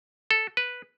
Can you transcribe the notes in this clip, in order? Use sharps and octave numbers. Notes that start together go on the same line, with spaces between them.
A4
B4